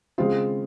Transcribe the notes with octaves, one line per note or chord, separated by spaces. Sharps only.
C#3 G#3 C4 F4